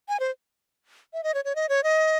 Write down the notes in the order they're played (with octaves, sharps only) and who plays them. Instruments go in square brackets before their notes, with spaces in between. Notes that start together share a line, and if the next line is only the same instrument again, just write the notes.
[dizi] G#5
C5
E5
D#5
C#5
C#5
D#5
C#5
D#5